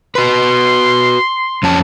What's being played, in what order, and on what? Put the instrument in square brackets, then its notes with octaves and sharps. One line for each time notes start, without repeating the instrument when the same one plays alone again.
[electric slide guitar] F#4 B4 [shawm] C6
[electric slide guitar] F2 C#4 A5